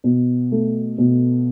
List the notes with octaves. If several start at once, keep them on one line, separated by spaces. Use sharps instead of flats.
B2
A3
B2